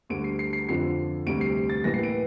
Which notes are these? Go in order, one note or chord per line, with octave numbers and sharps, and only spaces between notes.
D2 D3 G3 D7
C7
C7
C7
F2 D3 F3 C7
D2 C3 G3 D7
C7
A6
A2 E3 A#3 A#6
C7
D7